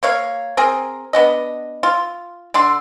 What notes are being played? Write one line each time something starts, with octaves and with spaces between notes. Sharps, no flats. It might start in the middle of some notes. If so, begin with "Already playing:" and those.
A#3 C#5 F5
C4 G#4 A#4
B3 D4 D#5
F4
D3 D4 C6